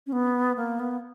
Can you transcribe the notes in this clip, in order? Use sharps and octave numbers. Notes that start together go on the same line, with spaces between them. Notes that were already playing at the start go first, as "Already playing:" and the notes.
C#4
B3
A#3
B3